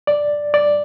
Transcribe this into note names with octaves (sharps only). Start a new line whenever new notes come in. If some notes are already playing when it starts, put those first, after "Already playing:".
D5
D5